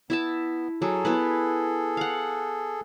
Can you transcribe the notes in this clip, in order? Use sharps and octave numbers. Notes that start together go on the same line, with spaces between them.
B3 E4 E5 A5
F#3 G#4 A4
B3 E4 B4
F5 F#5